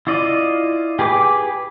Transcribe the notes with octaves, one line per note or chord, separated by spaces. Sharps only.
E4 F4 D5 D#5
G4 G#4 B4 D6